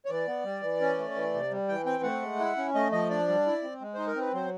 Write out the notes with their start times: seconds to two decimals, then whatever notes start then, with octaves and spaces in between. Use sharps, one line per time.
0.05 C#5
0.09 E3 D5
0.27 B3
0.45 G3
0.62 E3
0.81 C#4
0.98 A3
1.16 E3
1.34 C3
1.51 G3
1.68 E3 G5
1.86 C4 G5
2.03 A3 F#5
2.22 G#3
2.39 E4
2.57 C#4
2.74 A3 D#5
2.92 F3 D#5
3.10 D4 D5
3.28 G3
3.46 E4
3.63 C4
3.81 G#3
3.94 D#4 C5
4.07 A#4
4.16 C4 B4
4.33 F#3 C5